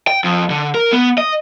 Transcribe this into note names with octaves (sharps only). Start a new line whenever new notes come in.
G5
F2
D3
A#4
B3
D#5